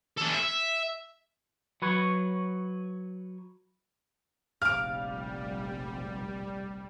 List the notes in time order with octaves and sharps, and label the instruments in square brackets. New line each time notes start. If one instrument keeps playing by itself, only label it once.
[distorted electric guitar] C#4 A4
E5
[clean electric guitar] F#3 B4 C#5
[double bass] F1 A#1 [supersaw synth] G3 [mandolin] F5 D6 [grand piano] F6